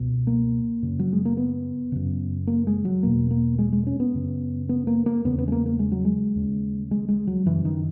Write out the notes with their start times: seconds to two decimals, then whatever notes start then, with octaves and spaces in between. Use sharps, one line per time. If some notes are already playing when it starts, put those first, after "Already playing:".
Already playing: C#2 B2
0.27 A#3
0.82 F#2 C#3
0.99 F#3
1.13 G#3
1.25 A#3
1.37 B3
1.92 F#2 C#3
2.47 A#3
2.67 G#3
2.85 F#3
3.03 E2 B2 A#3
3.31 A#3
3.59 G#3
3.72 G#3
3.87 C#4
4.00 B3
4.14 F#2 C#3
4.69 B3
4.87 A#3
5.06 A#3
5.25 E2 C#3 B3
5.38 B3
5.48 G#3
5.52 A#3
5.66 A#3
5.79 G#3
5.92 F#3
6.05 G#3
6.35 D#2 C#3
6.91 G#3
7.08 G#3
7.27 F#3
7.46 F#2 C#3 E3
7.65 D#3